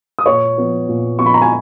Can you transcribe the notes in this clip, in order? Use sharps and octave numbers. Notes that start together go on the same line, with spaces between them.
D#6
A#2 C#5 C#6
F3 B3
A#2
F3 B3 C#6
B5
A#5
G#5